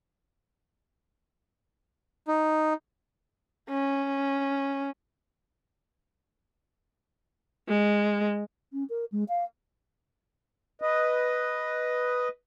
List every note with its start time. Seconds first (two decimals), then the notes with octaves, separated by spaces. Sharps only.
2.28 D#4
3.69 C#4
7.68 G#3
8.72 C#4
8.89 A#4
9.12 G#3
9.28 F5
10.82 B4 D#5